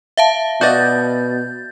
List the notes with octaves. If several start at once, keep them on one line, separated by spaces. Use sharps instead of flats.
E5 F5 A5
B2 F#4 D5 D#5 G6 A6